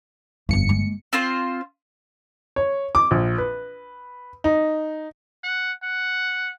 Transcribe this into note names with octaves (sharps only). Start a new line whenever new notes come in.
G1 F2 B3 C#7
G#3 A#3
C4 F4 C5 C6
C#5
D6
A#1
B4
D#4
F#5
F#5